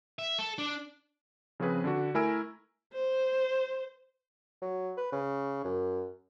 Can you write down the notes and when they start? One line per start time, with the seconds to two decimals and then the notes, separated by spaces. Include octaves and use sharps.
0.19 E5
0.39 A4
0.58 D4
1.60 C#3 F3 C4 C#4 G#4 B4
1.84 D3 D4 F#4
2.14 A3 E4 A#4 G#5 E6 D7
2.94 C5
4.61 F#3
4.97 B4
5.12 C#3
5.64 F#2